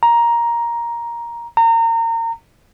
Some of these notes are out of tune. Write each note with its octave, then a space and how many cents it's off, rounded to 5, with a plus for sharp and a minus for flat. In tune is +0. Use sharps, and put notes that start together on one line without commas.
A#5 +10
A#5 -30